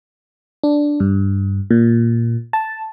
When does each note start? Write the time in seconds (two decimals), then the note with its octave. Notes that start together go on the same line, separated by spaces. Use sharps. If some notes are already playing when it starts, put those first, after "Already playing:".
0.63 D4
1.00 G2
1.71 A#2
2.53 A5